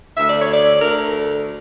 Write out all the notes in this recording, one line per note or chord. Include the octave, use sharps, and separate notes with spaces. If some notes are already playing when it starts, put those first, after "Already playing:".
D2 D3 A3 E5
D5
C#5
D5
D2 D3 A3 A#4